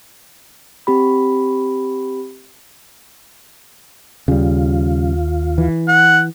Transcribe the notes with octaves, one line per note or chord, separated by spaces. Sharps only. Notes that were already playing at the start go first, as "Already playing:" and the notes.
C4 G4 B5
D#2 C#3 G3 F4
E3
F#5